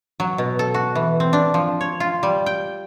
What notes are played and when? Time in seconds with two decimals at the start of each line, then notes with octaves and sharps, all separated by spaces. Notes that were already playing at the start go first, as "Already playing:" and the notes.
0.20 F#3
0.38 B2
0.59 A4
0.74 F#4
0.95 E3
1.20 C4
1.33 D4
1.54 F3
1.81 C#5
2.00 F4
2.23 G3
2.46 G5